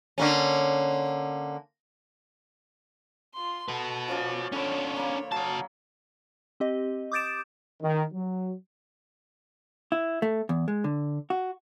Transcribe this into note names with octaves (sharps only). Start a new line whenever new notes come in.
D3 A#3 C#4
F4 C6
F#4 A4 B4
F3 C#4 D5
D3 C#4 D4 C#5 B5
A#3 B5
F#3 F#4 A5
C4 G4 D#5
D6 D#6 G6 A6 D7 E7
D#3
F#3
E4
A3
E2
G#3
D3
F#4